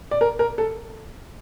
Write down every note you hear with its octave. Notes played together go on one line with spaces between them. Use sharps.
D5
A#4
A#4
A4